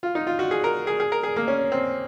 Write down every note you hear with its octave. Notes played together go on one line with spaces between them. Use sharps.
F4
D#4
F4
F#4
G#4
A#4
G#4
G#4
A#4
G#4
A#3
C#4
C4